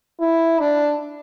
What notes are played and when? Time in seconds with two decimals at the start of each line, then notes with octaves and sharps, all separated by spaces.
0.20 E4
0.59 D4